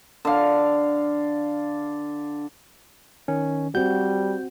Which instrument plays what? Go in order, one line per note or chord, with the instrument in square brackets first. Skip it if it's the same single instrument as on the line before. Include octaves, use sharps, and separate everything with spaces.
[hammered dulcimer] D3 F5
[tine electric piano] D#3 C#4
[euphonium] G3 [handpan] C4 F#4 [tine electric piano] G6